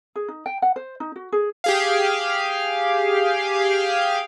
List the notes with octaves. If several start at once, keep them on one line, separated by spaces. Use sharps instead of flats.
G#4
D#4
G5
F#5
C5
D#4
F#4
G#4
G4 G#4 F5